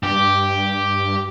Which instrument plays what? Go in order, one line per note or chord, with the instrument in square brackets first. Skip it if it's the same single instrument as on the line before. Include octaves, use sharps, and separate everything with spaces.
[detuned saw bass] G2 [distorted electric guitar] G4